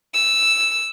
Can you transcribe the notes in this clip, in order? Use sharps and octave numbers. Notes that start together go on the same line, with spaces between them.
E6